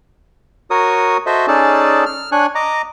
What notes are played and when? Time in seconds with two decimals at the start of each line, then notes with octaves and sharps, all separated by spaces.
0.70 F#4 A#4 C#5 D#6
1.26 F#4 A4 C5 D#5 E5
1.48 C#4 D#4 G#4 A4 D5 A5
2.06 F6
2.32 D4 C#5 G#5 F#6
2.55 D#5 A#5 D6